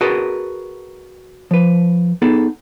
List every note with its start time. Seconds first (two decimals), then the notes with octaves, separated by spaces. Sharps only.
0.01 F#4 G#4 A#4 B4 A5
1.51 F3 B4
2.22 B3 D#4 G#4 A4